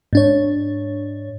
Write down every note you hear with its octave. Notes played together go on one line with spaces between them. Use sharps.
G#2 D4 C#5